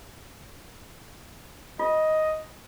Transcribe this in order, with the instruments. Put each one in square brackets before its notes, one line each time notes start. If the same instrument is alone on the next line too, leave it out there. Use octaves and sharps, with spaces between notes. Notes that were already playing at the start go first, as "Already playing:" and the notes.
[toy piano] F4 [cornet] D#5